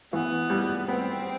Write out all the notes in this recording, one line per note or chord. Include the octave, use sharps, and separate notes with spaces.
E3 B3
G3
B3 C4